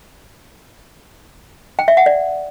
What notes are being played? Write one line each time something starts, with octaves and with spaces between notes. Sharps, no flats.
G5
E5
F#5
D5